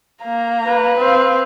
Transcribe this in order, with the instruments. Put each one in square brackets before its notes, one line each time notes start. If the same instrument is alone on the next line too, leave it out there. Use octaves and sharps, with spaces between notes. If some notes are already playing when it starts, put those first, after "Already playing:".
[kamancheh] A#3 A#5
[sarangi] B4
[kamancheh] C4 F5